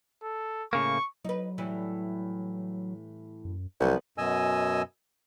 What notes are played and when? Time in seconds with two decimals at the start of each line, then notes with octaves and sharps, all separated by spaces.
0.23 A4
0.73 A2 C#3 A#3 C#6
1.25 F#3 D#4 B4
1.58 A2 E3 G3
3.45 F#2
3.80 C2 F3 F#3 B3
4.18 F#2 B2 D#5 G#5 E6